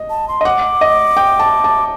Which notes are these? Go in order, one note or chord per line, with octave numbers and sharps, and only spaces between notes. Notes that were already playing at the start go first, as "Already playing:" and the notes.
Already playing: D#5
A5
C6
D#5
F#5 D6
D#5
G5
A5
A5